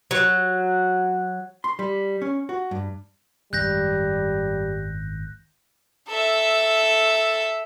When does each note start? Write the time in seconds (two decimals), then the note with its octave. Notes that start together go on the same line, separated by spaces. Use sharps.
0.11 F#3
1.64 C6
1.79 G3
2.22 C#4
2.49 F#4
2.71 G2
3.53 G#1 F#2 G3 F#6 G6 A#6
6.09 A4 E5